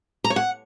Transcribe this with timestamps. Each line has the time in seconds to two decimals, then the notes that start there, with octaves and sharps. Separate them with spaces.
0.24 A#5
0.30 C#5
0.36 F#5